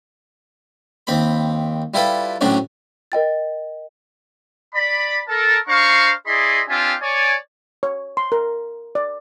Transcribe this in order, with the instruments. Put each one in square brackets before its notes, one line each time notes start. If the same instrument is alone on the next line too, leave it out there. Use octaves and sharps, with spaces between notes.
[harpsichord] D#2 C4 B5
G3 E4 F4 A4 B4
A2 C3 F#3 C#4 D4
[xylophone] A#4 D#5 G5 A6
[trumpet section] D5 B5
A4 A#4 A5
D4 C5 F5 A#5 C#6
E4 G#4 D5 D#5 B5 C6
C4 D4 F4 G4 E5 G#5
C#5 D5 G#5
[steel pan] C#5
C6
A#4
D5